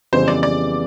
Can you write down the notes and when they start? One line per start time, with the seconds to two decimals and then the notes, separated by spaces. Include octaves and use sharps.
0.13 F2 C#3 E3 G3 B3 C5
0.28 D5
0.43 D5